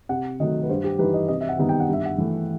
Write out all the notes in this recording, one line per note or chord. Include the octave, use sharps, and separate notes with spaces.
C3 F#5
D#3 F#3 A3 D#5
B4
G2 C5
G4
E3 G3 D#4 B4
D#5
C3 D#5
E5
F#5
D#3 G3 B3 D#4
G5
F#5
G2 E5
F#5
E3 A3